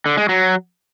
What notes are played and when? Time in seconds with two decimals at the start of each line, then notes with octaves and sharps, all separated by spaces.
0.06 D3
0.17 G#3
0.29 F#3